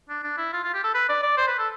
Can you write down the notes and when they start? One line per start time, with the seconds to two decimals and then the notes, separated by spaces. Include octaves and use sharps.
0.09 D4
0.24 D4
0.37 E4
0.53 F4
0.64 F4
0.74 G4
0.84 A4
0.94 B4
1.09 D5
1.23 D5
1.37 C5
1.48 B4
1.58 A4